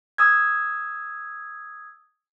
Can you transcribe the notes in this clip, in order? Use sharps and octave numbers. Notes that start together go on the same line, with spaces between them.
D#6 E6 G#6